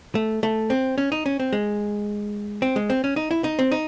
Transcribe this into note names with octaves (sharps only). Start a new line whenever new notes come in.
A3
A3
C4
C#4
D#4
C#4
C4
G#3
C4
G#3
C4
C#4
D#4
E4
D#4
C4
D#4